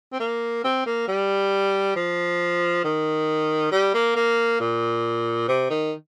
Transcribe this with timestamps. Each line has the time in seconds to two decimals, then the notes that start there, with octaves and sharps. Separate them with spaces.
0.13 C4
0.20 A#3
0.64 C4
0.86 A#3
1.08 G3
1.96 F3
2.84 D#3
3.72 G3
3.94 A#3
4.16 A#3
4.60 A#2
5.48 C3
5.70 D#3